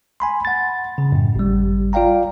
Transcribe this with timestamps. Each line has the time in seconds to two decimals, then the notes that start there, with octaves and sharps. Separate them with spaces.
0.20 G#5 B5 C6
0.45 F#5 A6
0.98 C#3
1.12 F#2 A2
1.35 G#1 G3
1.93 F4 D5 F5 G5 A#5